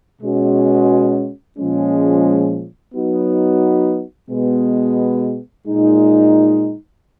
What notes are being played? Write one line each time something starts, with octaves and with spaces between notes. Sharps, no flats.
B2 G#3 C#4 F#4
A#2 F3 G#3 C#4
F#3 B3 D#4 F#4
B2 G#3 B3
A#2 G#3 D#4